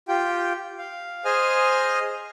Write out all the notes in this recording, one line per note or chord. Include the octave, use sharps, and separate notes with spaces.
F4 G4 G5
F5
G#4 C5 D#5 G#5 D#6 F6